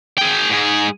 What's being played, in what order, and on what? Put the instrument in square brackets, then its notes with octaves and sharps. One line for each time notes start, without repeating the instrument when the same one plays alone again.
[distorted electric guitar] G#4 G5
G#2 G#4